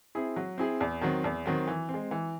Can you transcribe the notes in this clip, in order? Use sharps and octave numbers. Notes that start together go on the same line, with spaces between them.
C4 E4 G#4
F#3
C4 E4 G#4
E2
D#3 F#3 C4
E2
D#3 F#3 C4
E3
C4
G#3
E3